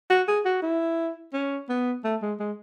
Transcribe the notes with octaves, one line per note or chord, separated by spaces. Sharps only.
F#4
G#4
F#4
E4
C#4
B3
A3
G#3
G#3